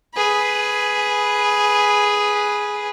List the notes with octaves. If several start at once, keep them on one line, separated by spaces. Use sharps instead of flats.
G#4 B4